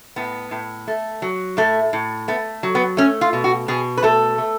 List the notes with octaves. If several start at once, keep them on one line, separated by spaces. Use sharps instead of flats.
A2 B3
A2
A3
F#3
A2 A3
A2
A3 B3
F#3
B3
A3 C#4
F4
B2
F#4
B2 G#4
B4
A3 A4
A3